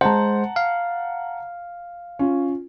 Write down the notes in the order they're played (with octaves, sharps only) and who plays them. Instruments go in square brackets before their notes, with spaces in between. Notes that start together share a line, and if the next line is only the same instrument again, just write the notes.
[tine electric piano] G#3 C5 [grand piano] F#5 A5 A#5
[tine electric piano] F5
[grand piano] C#4 F4